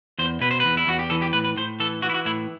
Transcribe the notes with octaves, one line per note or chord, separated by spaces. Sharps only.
E2 C5
B2 B4
C5
E2 B4
E4
E2 F#4
G4
E3 A4
G4
A2 B4
B4
A2 C5
E3 A4
E3 F#4
E4
F#4
A2 E4